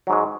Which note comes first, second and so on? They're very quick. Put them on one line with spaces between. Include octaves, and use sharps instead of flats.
F#3 G#2 G#3